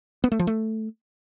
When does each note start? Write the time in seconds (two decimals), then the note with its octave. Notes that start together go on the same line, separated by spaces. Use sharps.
0.24 B3
0.32 A3
0.39 F3
0.47 A3